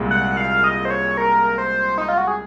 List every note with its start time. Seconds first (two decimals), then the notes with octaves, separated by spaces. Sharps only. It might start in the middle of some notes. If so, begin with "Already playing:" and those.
Already playing: C2 A#2 G#3
0.11 F#5
0.37 F5
0.64 D#5
0.85 C5
0.90 C#5
1.17 A#4
1.58 C5
1.98 D#4
2.08 F4
2.18 F#4
2.28 G#4